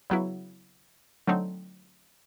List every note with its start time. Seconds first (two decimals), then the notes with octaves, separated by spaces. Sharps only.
0.10 C#3 F#3 B3 E4
1.27 D3 F#3 A3 C4 D#4